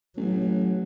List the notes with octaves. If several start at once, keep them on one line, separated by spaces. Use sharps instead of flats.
A1 F#3